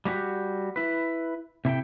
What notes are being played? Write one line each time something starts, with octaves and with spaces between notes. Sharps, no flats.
G3 A#3 C#4 F#4 G4
E4 B4
C3 E4 A4 G5